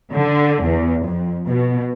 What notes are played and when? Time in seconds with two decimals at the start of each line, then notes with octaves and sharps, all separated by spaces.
0.13 D3
0.63 E2
1.06 F2
1.46 B2